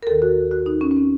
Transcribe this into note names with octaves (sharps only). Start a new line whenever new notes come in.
A#4
D#2 D#3 A4
F#4
F#4
D#4
C#4
C#4
C4